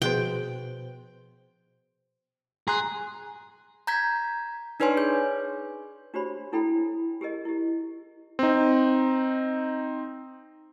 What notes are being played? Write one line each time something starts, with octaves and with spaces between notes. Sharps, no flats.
B2 F3 G#4 B4 C5 G5
G#4 A#5 C6 F#6
A#5 G6 G#6 B6
D4 D#4 B4 C#5 G#5 C6
G#4 G6
D4 F#4 G4 C5 C#5 B5
D4 E4 A4 G5 B5
G4 G#4 A#4 D#5
E4 G4
C4 D#4